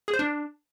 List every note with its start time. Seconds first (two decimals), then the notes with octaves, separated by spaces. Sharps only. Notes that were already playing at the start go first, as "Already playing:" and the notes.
0.08 G#4
0.14 C5
0.19 D4